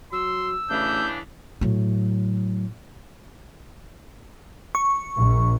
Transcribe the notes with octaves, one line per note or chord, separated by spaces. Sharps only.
F#3 C6 E6
A1 C#3 E3 D4 G6
A2 F#3
C#6
A#1